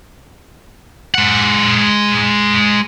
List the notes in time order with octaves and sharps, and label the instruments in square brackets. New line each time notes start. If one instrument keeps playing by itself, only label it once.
[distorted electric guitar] G#3 F#5